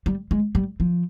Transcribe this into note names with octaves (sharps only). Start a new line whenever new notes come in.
G3
G#3
G3
F3